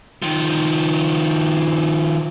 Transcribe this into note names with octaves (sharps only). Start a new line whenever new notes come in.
D#3 F3